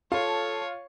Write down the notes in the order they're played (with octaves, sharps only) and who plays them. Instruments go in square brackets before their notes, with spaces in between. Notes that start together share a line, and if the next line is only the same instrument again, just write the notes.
[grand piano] F4 F5 [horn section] A4 A5 [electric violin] C#5